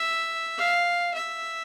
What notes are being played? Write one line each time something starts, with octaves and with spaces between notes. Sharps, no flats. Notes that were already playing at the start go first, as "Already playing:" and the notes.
Already playing: E5
F5
E5